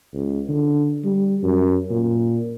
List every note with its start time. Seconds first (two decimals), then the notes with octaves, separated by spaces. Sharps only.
0.13 C#2
0.48 D3
1.04 G3
1.43 F#2
1.90 A#2